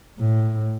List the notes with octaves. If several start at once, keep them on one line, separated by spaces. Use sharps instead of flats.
A2